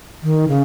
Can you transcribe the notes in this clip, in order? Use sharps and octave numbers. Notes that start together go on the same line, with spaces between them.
D#3
C#3